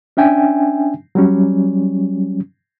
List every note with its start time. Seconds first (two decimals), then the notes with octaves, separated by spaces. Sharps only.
0.17 C#4 D4 E5 G5 G#5
1.15 F#3 G3 C#4